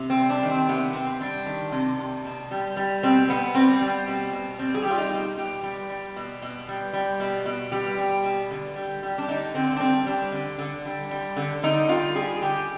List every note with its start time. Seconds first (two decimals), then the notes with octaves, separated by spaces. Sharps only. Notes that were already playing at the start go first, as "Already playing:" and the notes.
Already playing: C3
0.10 C4
0.16 G3
0.30 D4
0.43 D#3
0.49 C4
0.69 C3 B3
0.94 C3 C4
1.21 G3 D4
1.46 D#3
1.72 C3
1.99 C3
2.25 B2
2.51 G3
2.77 G3
3.03 B2 C4
3.29 B2 B3
3.55 G3 C4
3.81 G3
4.07 B2
4.33 B2
4.59 G3 C4
4.74 G#4
4.83 G4
4.86 G3 F4
4.98 D#4
5.12 B2
5.38 B2 G4
5.63 G3
5.90 G3
6.16 B2
6.42 B2
6.68 G3
6.93 G3
7.20 B2
7.45 B2
7.72 G3 G4
7.98 G3
8.24 B2
8.51 D3
8.76 G3
9.03 G3
9.18 D4
9.28 D3 D#4
9.54 D3 C4
9.76 D4
9.80 G3 C4
10.06 G3 D4
10.32 D3
10.58 D3
10.85 G3
11.11 G3
11.36 D3
11.63 D3 D#4
11.89 G3 F4
12.15 G3 G#4
12.42 D3 G4